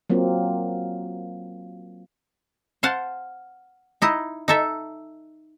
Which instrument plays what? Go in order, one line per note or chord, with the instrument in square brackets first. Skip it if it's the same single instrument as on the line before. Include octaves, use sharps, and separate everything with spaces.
[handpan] F#3 A#3 C4 F4
[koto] C5 F5 F#5 A5
D#4 E4 D#5
D#4 A4 E5